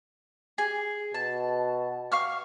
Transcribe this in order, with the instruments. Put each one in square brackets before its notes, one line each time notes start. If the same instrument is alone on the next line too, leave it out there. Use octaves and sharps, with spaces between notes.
[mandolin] G#4
[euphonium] B2 [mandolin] A5
[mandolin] F5 C#6 F6